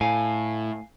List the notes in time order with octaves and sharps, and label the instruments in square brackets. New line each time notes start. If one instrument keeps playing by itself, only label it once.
[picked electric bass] A2 [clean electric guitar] F5 G#5